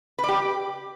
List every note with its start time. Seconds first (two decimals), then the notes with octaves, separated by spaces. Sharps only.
0.19 B4
0.24 D5
0.29 G4